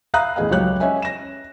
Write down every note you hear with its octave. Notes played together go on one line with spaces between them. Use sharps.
E5 F5 A#5 B5 D#6 F#6
A1 E2 A3 G#4 D#5 F5
C#2 F#3 G4 C#5 F#6
C#4 C#5 D#5 E5 G#5
A#6 E7